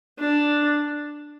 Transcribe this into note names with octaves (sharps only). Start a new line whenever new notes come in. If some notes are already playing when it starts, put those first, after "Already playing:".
D4